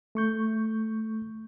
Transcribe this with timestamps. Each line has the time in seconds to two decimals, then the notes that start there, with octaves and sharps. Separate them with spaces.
0.15 A3 C#6 G6